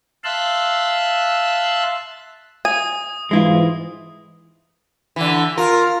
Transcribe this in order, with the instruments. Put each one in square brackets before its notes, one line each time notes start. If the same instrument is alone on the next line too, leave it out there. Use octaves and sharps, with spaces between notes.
[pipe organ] E5 F5 A5 C6 E6 F#6
[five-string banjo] G#5 [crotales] D#6
[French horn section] G#2 E3 [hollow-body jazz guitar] G#3 E4 F4
[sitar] D3 E3
[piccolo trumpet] F4 [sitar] A#4